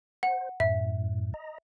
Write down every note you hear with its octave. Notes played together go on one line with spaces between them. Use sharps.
C5 F#5
F#2 A2 E5
D#5 A#5